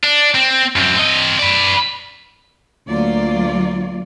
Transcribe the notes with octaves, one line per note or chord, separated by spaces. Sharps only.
D4
C4
F#2 C4
C4 D#5
B4 D5
D2 F#3 A3 A#3 F4 D5